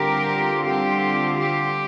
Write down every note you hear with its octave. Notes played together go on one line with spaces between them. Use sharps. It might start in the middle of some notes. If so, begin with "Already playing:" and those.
Already playing: D3 G3 C4 F4 G4 A#4
G4
G4